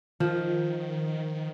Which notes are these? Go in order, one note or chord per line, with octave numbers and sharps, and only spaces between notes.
D#3 F3